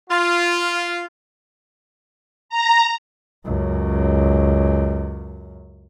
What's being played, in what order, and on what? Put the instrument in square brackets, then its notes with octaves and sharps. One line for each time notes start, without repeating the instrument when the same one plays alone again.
[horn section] F4
[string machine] A#5
[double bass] C#2 F#2